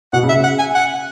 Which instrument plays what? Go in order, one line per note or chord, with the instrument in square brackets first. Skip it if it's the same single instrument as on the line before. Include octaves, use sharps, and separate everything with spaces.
[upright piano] B2 [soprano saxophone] F#5
[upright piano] C#3
[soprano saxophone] E5
[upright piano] C#3
[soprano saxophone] F#5
G#5
F#5